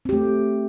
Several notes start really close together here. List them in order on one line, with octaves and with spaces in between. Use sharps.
C4 G4 A3